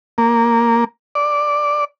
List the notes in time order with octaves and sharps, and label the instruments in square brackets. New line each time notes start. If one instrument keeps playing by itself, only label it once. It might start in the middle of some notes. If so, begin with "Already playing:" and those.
[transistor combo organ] A#3
D5